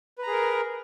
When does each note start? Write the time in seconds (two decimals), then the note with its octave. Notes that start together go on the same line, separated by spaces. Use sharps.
0.18 B4
0.23 A#5
0.27 G#4
0.32 A#4